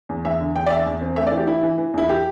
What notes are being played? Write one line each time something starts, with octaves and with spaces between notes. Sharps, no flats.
E2
E2 E5
D3
E2 G5
D5
E2 E5
E2
C4
A3 E5
D5
E3
G4
E3 E4
E3
E3
E2 E4
G4